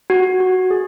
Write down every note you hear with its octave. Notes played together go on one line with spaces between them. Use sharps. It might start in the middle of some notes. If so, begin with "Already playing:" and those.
F#4
F#4
G#4